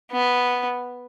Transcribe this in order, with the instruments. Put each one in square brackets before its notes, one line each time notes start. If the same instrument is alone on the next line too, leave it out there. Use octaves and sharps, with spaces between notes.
[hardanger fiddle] B3